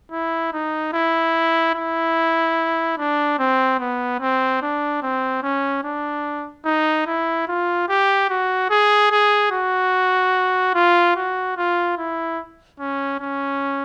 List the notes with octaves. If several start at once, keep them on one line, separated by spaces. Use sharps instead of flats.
E4
D#4
E4
E4
D4
C4
B3
C4
D4
C4
C#4
D4
D#4
E4
F4
G4
F#4
G#4
G#4
F#4
F4
F#4
F4
E4
C#4
C#4